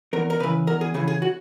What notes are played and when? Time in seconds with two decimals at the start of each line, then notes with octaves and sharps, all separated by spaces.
0.13 E2 A#4
0.30 A#4
0.40 C#3 B4
0.43 E3
0.67 E2 A#4
0.81 G#4
0.94 C#3 E3 G#4
1.08 G#4
1.22 F#4